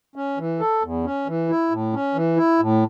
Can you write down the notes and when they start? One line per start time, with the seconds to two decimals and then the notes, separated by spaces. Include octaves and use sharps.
0.15 C#4
0.38 E3
0.60 A4
0.82 E2
1.04 C#4
1.27 E3
1.49 E4
1.70 A2
1.93 C#4
2.14 E3
2.36 E4
2.60 A2